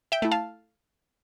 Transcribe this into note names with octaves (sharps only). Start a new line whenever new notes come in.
E5 G5
A3 E4
F5 A5